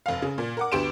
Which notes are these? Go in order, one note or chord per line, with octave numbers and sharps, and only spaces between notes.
F1 F5
C#3
A#2
A#4 F#5 D6
D2 B3 G4 C6 D7 E7